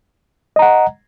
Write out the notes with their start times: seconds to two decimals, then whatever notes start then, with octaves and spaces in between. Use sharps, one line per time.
0.56 D#5
0.59 A#5
0.62 F#5